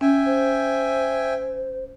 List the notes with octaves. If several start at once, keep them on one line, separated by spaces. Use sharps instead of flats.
C#4 E5 G5 G#5
C5